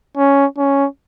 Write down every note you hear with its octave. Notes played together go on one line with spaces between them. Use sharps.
C#4
C#4